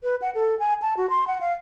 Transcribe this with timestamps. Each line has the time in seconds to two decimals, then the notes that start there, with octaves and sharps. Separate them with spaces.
0.03 B4
0.22 F#5
0.35 A4
0.59 G#5
0.82 A5
0.97 F#4
1.10 C6
1.27 F#5
1.41 F5